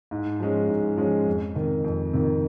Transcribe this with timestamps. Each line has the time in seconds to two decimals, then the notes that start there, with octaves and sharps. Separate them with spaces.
0.11 G#2
0.40 F3 G#3 C#4
0.69 G#2
0.97 F3 G#3 C#4
1.26 F2
1.55 C3 D#3
1.84 F2
2.13 C3 D#3